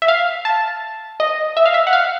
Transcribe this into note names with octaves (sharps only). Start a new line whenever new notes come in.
E5
F5
A5
D#5
E5
F5
E5
F#5
F5